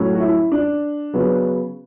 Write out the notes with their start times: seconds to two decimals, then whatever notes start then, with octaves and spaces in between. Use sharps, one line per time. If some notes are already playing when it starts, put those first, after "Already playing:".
Already playing: A2 F#3 A3 C#4
0.15 F#4
0.20 E4
0.52 D4
1.14 C#3 F#3 B3